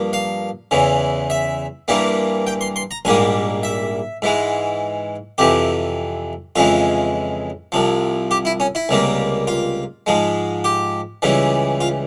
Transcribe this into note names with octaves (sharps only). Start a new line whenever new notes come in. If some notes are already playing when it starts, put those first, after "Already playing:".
Already playing: G2 F3 A#3
F5
E2 C#3 E3
E5
G2 E3 G3 A#3
G5
C6
C6
A#5
A#1 G#2 G3 A#3 G#5
E5
G#2 E3 G#3
F2 C3 E3 G4
F2 C#3 E3 G#3 F4
C2 C3 F3
G4
E4
C#4
E4
C#2 C3 G3 A#3
F4
G#2 F3 G#3
G4
C#2 C#3 E3 G3
F4